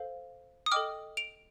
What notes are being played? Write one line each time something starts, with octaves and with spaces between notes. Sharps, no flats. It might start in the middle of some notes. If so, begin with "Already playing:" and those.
Already playing: A4 C5 F5
D#6
A4 D#5 G5 D6 F6
D7 F7